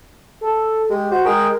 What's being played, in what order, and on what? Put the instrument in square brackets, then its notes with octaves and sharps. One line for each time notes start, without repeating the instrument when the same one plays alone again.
[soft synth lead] A4
[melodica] G#3 [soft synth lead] G4
[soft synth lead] F#4 [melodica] C5
[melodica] G#3 G#4 G5 [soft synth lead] A#4